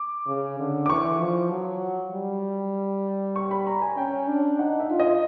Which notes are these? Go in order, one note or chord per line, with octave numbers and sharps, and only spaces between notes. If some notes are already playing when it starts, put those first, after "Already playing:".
Already playing: D6
C#3
D3
D6
E3 C#6
F3
F#3
G3
C#6
B5
A#5
G#5
C#4 G5
D4
D#4 F#5
E5
F4
D#5